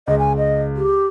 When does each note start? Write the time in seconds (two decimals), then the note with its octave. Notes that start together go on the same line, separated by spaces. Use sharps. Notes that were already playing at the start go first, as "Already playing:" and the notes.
0.07 C#2 D#5
0.19 G#5
0.37 D#5
0.76 G4